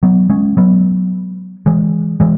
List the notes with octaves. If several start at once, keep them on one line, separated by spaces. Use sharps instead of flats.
F#3 B3
G#3 C#4
F#3 B3
E3 G#3
E3 G#3